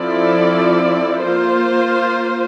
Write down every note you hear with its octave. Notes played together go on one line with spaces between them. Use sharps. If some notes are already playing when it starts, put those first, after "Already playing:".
Already playing: F3 C4 E4 A4 D5
A#3 F4 C5